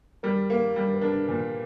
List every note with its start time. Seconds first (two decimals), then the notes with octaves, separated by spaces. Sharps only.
0.23 G3 A#4
0.50 A#3
0.76 G3
0.94 B4
1.01 D4 A#4
1.29 A#2